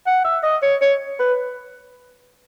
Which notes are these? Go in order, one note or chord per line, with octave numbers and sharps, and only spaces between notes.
F#5
E5
D#5
C#5
C#5
B4